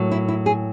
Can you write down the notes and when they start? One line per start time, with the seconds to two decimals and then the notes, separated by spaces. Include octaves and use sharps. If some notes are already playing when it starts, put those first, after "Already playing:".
Already playing: A2 F#3 A#3
0.12 E4
0.28 E4
0.46 G#4